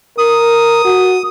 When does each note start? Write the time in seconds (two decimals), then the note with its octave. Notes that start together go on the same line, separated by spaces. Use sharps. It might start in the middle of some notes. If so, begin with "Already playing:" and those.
0.18 A#4 D#6
0.85 F#4